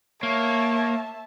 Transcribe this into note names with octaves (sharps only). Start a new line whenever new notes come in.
A#3 C#5 E5 A5